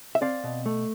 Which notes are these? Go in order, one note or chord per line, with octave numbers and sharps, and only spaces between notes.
E5
C4 D5 F5
B2
A3